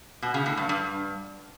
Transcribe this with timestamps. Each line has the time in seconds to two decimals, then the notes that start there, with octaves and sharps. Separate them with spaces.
0.22 B2
0.34 C#3
0.46 A2
0.57 G2
0.69 G2